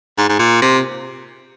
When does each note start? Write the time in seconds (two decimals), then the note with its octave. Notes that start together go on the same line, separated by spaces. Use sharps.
0.18 G#2
0.29 G#2
0.39 A#2
0.62 C3